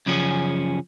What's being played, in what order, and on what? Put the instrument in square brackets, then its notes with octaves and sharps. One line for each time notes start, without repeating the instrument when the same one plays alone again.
[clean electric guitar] F#2 C#3 F3 C#4 G#4